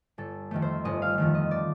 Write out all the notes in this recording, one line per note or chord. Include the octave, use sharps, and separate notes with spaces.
G1 A4
F2 D#3 A3
C5
G1 D#5
F5
F2 D#3 A3 F5
D#5
D5